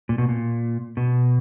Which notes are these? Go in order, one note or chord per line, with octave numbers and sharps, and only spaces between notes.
A#2
B2
A#2
B2